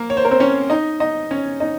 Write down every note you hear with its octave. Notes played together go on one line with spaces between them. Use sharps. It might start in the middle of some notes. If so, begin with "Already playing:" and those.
Already playing: A#3 A#4
C#5
C5
A#4
C4 C5
C#4 C#5
D#4 D#5
D#4 D#5
C#4 C#5
D#4 D#5